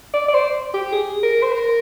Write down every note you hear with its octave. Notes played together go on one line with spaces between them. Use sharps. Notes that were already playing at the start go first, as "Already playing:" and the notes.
D5
D5
C5
G4
G#4
A#4
C5
A#4